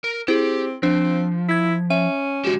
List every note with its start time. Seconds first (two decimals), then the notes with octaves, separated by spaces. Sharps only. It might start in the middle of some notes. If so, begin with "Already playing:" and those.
0.04 A#4
0.28 C4 E4 G4 G#4
0.83 F3 C4 D4
1.49 E4 G#6 B6
1.90 C#4 E5
2.45 D3 G#3 F#4 G4 E7